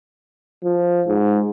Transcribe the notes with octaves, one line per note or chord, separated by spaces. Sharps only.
F3
G#2